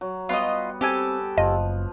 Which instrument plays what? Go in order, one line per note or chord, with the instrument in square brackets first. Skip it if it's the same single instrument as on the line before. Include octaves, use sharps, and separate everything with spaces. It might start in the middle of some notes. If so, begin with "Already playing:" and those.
[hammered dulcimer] F#3
[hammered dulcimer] G3 B3 F#4 [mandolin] F4 D#5
[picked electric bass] C4 [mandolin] G4 A4 G#5
[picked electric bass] F#1 [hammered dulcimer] F3 [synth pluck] D#5